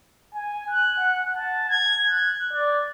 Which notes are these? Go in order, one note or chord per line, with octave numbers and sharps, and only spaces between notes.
G#5
F#6
F#5
A5
G#6
F#6
D5